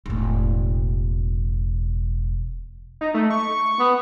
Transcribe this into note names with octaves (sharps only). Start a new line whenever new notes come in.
E1 A2
D#4
A3
C#6
B3